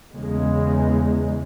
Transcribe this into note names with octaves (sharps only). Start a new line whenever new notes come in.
E2 C#3 G#3